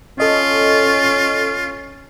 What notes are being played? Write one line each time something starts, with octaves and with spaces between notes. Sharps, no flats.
C#4 F4 A4 D#5